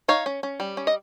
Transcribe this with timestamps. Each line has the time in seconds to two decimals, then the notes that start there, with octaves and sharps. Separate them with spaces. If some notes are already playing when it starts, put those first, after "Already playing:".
0.08 D#4 C#5 F5
0.26 C#4
0.43 C#4
0.60 G3
0.77 C#4
0.87 D#5